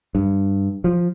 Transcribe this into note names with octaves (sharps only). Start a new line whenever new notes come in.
G2
F3